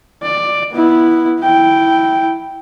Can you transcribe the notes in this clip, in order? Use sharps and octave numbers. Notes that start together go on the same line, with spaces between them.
D5
B3 E4
E4 G5